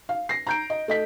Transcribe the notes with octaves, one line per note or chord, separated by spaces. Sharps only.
F5
A#6 C7
A#5 G6 D7
D#5
A3 D#5 B6